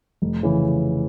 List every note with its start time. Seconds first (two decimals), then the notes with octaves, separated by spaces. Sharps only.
0.22 F1
0.43 C#3 E3